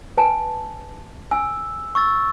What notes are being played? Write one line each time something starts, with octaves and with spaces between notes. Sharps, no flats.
B4 G#5 A5
G#5 E6
C#6 E6 A6